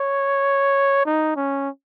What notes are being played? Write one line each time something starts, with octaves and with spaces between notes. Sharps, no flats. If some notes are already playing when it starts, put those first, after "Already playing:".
Already playing: C#5
D#4
C#4